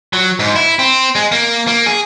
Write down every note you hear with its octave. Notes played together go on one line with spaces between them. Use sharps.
F#3
G#2
E4
C4
G#3
A#3
A#3
G#4